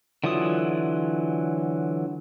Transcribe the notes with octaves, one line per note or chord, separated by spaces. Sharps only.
D3 E3 F#3 F4 D#6